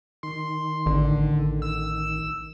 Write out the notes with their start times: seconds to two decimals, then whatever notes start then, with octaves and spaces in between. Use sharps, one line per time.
0.23 D#3 C6
0.86 A1 D3
1.62 E6